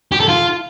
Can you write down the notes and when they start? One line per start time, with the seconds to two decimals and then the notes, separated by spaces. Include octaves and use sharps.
0.12 G4
0.20 A4
0.28 F4